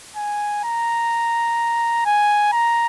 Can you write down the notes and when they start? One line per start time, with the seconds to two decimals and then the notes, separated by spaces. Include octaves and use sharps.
0.17 G#5
0.64 A#5
2.05 G#5
2.53 A#5